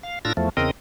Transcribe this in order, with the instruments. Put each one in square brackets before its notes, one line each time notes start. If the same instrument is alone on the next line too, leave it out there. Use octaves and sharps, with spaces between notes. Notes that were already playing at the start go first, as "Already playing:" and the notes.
[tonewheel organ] F5
A2 D4 F4 E6 A#6
E2 F3 A3
E2 C#3 C4 A#4 D#5